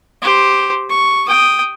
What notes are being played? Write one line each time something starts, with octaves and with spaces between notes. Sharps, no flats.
G4 C5
C#6
G5 D#6